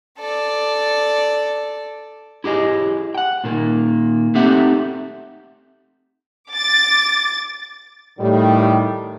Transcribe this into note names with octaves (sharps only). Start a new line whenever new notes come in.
A4 D5
E4 G4 G#4 D#5
F#5 G5
A#2 D#3 A#3
A3 C4 D#4 G4 E5 F#5
D6 A6
A2 D#3 G3